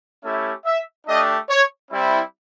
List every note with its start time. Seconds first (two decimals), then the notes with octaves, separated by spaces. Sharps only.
0.23 A3 C#4 E4 G4 E5
0.65 E5
1.07 A3 D4 G4 D#5
1.49 C#5
1.91 G3 C4 E4